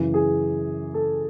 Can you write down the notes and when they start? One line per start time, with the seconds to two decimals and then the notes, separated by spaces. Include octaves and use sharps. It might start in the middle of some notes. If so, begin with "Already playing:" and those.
Already playing: F#2 C#3 E3
0.14 G#4
0.94 A4